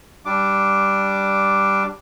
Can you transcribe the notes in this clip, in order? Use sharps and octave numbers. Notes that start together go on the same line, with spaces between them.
G3 D4 D6